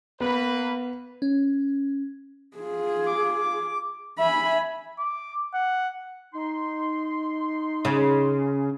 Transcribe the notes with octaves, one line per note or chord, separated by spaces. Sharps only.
A#3 B3 B4
C#4
F4 G#4
D6
E5 G#5 B5
D6
F#5
D#4 C6
C#3